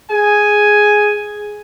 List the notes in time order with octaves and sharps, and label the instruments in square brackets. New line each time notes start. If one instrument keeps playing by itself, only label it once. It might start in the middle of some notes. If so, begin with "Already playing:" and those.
[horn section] G#4 G#5